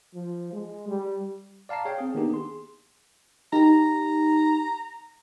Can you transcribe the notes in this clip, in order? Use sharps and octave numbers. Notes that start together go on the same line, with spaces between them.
F3
G#3
G3
D5 F5 A5 A#5 C7
G#4 C#5 F5 G5
C4 G#4
D#3 A#3 B3 D4 D#4 G4
G#4 C6
D#4 G4 A#5